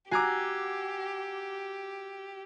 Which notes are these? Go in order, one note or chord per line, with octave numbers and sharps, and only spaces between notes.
F#4 G4 G#5 A#5 D6 E6 G#6 C7